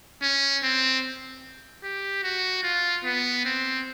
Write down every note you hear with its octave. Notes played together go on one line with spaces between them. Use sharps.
C#4
C4
G4
F#4
F4
B3
C4